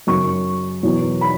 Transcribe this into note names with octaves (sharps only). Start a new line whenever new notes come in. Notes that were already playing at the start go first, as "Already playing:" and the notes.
F#2 C#3 F#3 C#6
E2 B2 F#3
B5